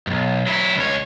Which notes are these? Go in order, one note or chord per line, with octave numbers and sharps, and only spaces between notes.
B1 G2
F#3 E4
C#2 C#5